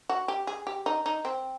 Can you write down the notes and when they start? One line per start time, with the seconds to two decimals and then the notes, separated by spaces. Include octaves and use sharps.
0.09 F#4
0.28 G4
0.47 G#4
0.67 G4
0.86 D#4
1.06 D#4
1.25 C4